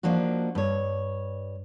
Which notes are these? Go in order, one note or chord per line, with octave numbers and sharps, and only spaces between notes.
F3 A#3 D4 D#4 F#4
G2 C#5